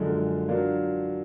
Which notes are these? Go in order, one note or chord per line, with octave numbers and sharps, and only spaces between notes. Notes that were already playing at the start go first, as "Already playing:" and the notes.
Already playing: F#2 D3 F3 G#3
F#3 D4 F4 A#4